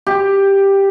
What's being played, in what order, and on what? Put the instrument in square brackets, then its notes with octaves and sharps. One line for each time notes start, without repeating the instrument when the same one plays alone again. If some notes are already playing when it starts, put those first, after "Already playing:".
[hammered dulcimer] G4